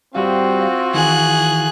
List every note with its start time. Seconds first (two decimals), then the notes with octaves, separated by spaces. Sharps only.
0.15 G3 C4 F4 F#4 F5
0.94 D#3 E3 G#4 F#6